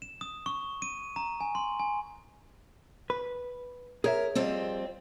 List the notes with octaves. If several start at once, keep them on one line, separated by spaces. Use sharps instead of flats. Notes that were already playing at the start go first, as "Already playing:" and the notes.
E7
D#6
C#6
D#7
A#5
G#5
C6
G#5
B4
G#4 A#4 C#5 E5
F2 G3 C4